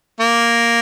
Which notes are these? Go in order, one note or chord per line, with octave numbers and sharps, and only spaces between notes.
A#3